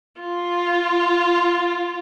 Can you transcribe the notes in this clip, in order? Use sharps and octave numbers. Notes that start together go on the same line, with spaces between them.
F4